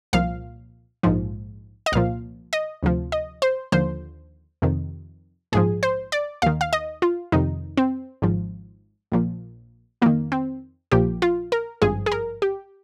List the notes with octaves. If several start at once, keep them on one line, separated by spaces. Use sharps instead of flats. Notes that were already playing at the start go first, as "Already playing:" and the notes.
C2 A#2 F3 F5
A#1 G#2 F3
D#5
C2 A#2 F3 F5
D#5
D2 C3 F3
D#5
C5
D#2 D3 F3 C5
F2 C3 D#3
A#1 G#2 F3 G#4
C5
D5
D#2 D#3 F5
F5
D#5
F4
F2 C3 D#3 D#4
C4
G#1 G#2 F3
A#1 A#2 F3
F2 D#3 A#3
C4
A#1 A#2 F3 G4
F4
A#4
G#1 G2 F3 G#4
G#4
A#4
G4